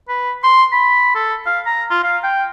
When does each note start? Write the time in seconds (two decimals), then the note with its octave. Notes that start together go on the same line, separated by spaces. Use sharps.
0.09 B4
0.44 C6
0.73 B5
1.15 A4
1.46 F5
1.66 A#5
1.91 F4
2.04 F5
2.24 G5